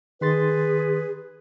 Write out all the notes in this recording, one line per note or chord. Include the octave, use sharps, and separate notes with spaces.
D#3 G#4 B4 C6 A6